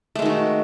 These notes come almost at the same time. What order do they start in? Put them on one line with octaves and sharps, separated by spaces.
A3 G#3 D#3 F#4